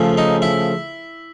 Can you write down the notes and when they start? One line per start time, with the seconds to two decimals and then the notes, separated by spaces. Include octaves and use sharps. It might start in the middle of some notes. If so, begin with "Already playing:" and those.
Already playing: C#3 F3 A3
0.17 D#4
0.42 E4